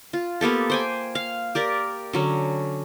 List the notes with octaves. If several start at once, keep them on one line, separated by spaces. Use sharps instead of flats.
F4
A#3 B3 G4 A4
C5 G5 G#5
F5
G4 A#4 D5
D3 F#3 C#4